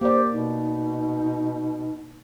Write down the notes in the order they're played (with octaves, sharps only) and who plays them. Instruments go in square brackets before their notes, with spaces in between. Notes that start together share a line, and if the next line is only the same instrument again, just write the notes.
[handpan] A#3 D5 [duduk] G4 [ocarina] C5
[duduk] B2 [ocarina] D#4